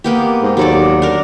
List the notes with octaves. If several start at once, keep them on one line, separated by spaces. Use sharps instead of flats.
A#3 B3 G4
G#2
D#2 F#3 A4 D5
D4 A#4